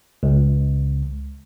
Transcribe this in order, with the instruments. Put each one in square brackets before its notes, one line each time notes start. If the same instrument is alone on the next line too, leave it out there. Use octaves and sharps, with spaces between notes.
[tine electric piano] C#2